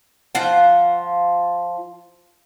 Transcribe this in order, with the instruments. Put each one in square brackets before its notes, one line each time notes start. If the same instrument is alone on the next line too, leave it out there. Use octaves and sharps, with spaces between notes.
[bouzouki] F3 F4 F#5